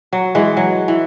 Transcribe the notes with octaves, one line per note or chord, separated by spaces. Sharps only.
F#3
E3 G#3
F#3
E3